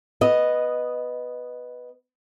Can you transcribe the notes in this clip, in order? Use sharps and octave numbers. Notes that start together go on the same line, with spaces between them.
B3 D#5